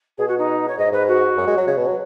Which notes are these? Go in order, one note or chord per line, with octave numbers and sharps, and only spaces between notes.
B2 G#4
F#4
D#4
C#5
G#2 D#5
G#2 B4
F#4
F#2
G#3
F#3
C#3
B2
F#3